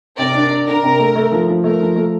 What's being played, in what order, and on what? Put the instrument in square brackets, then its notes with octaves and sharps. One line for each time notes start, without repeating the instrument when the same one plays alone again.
[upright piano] C3 [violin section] A#4 D5
[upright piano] D4
D4
[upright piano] D4 [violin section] A#4
[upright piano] C3
A3
A3
F3
F3
[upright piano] A3 [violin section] A#4
[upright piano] F3
A3